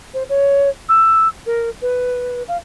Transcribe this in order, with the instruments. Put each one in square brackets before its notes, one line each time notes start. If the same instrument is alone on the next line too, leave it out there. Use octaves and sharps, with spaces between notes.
[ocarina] C5
C#5
E6
A#4
B4
F5